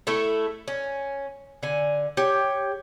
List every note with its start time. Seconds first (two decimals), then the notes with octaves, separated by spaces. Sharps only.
0.07 A3 E4 A4
0.68 C#4
1.63 D3 G#5
2.17 G4 C#5